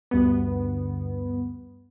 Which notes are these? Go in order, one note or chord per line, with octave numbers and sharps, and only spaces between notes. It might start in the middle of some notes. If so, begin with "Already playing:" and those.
D2 G2 B3